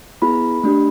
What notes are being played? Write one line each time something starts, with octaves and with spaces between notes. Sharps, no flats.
B3 E4 G#4 B5
A3 D4 G4